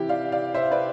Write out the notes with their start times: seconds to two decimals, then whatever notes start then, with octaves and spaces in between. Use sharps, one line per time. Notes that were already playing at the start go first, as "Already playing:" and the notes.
Already playing: C3 E3 E4 G4
0.09 D5 F5
0.32 D5 F5
0.54 C5 E5
0.71 B4 D5